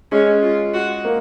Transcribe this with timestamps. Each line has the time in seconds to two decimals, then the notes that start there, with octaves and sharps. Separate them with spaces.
0.12 G#3 C#4
0.42 F4
0.74 F#4
1.05 A#3